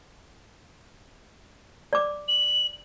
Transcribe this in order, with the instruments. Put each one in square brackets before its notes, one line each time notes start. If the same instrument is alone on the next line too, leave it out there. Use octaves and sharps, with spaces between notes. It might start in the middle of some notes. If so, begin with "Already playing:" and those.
[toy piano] D5 D6
[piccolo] F#7